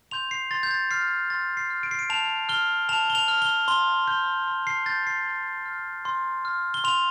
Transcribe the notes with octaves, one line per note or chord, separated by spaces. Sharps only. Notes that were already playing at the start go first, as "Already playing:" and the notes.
C6 G6 F7
C7
C6 A6
G6
A6
F6 C7
C6 A6
C7
F6
D7
C7
D7
A5 F7
F6 G7
A5 F7
G7
F7
F6
G7
C6 G7
G6 G7
C6
C7
G6 A6
C7
C6
F6
C6
F6
G7
C6 F7